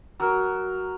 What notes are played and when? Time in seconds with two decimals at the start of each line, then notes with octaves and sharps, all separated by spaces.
0.20 F#3 A#4